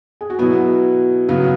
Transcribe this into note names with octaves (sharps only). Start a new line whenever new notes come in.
G#4
F#4
B2 F#3 B3 E4
C#3 F#3 B3